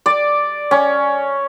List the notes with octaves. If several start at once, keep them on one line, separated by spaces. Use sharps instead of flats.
D5
C#4